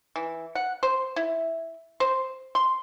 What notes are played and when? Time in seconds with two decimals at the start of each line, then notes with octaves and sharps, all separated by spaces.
0.16 E3
0.55 F#5
0.83 C5
1.16 E4
2.00 C5
2.55 C6